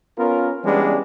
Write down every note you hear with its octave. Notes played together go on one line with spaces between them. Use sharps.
B3 C#4 F4 A#4
E3 G3 G#3 B3 C#4 D4